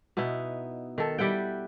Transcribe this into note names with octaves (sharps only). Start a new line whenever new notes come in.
B2 B3 D#4 E4
D#3 A4
G3 E4 F#5 G5